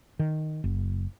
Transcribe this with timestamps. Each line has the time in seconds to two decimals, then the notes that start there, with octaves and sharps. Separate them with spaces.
0.19 D#3
0.64 F#1